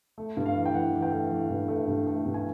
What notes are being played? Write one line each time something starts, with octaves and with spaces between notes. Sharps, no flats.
A3
G2
F5
E3
G5
E3 F#5
E3
G5
A3
E3
G2
A3
G2
A3
G2
G#5